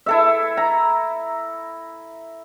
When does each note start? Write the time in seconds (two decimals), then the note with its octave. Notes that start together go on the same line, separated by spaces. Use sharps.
0.06 E4 A4 E5
0.57 A#5